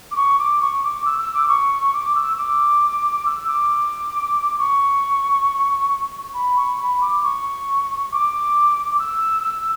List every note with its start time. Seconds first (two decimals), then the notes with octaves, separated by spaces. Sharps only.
0.11 D6
0.16 C#6
0.39 D6
0.61 C#6
0.83 D6
1.05 E6
1.19 E6
1.34 D6
1.48 C#6
1.93 D6
2.15 E6
2.38 D6
3.25 E6
3.47 D6
4.58 C#6
6.34 B5
6.56 C#6
6.79 B5
7.01 D6
7.23 C#6
8.12 D6
8.95 D6
8.99 E6
9.44 E6